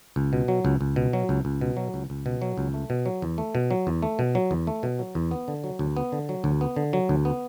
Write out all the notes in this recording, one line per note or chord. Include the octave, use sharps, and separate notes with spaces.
C#2
B2
F#3
C#2
C#2
B2
F#3
C#2
C#2
B2
F#3
C#2
C#2
B2
F#3
C#2
A3
B2
F#3
E2
A3
B2
F#3
E2
A3
B2
F#3
E2
A3
B2
F#3
E2
B3
D3
F#3
D2
B3
D3
F#3
D2
B3
D3
F#3
D2
B3